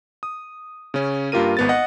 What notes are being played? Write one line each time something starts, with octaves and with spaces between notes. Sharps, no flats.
D#6
C#3 C#4
G2 A#3 F4 G4 A#4 D#7
G#1 B3 A6
D#5 F#5